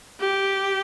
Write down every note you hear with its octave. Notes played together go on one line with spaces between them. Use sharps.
G4